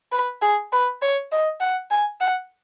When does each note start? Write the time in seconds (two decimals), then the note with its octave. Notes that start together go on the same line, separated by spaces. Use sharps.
0.12 B4
0.42 G#4
0.73 B4
1.02 C#5
1.32 D#5
1.61 F#5
1.91 G#5
2.21 F#5